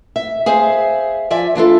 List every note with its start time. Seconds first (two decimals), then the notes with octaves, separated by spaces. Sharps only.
0.16 E5
0.46 G#4 C5 E5 F5
1.31 F3 D5 E5 G#5
1.55 E3 D4 F4 A4